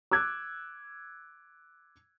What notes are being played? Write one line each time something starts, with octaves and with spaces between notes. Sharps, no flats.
D6 E6 F#6 G#6